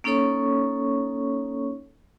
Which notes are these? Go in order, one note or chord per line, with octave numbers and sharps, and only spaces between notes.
A#3 C#4 D#4 A4 C#5 C#6